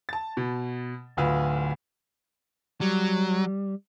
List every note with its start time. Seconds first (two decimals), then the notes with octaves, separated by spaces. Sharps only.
0.09 A5 A6
0.37 B2
1.17 D1 D2 F4 B4
2.81 F#3 G3